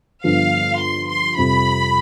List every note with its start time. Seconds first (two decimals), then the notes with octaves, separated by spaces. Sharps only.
0.24 G2 D3 F3 B3 F5
0.80 C6
1.09 C6
1.37 F2 C3 G3 C4 B5